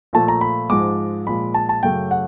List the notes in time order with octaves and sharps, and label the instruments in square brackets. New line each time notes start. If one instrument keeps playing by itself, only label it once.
[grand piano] A#2 F3 A3 A5
A#5
B5
G#2 F3 G#3 D6
A#2 F3 G#3 B5
A5
A5
F#2 C#3 F#3 A3 G5
F#5